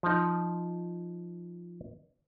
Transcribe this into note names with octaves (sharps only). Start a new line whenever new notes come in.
F3 D#4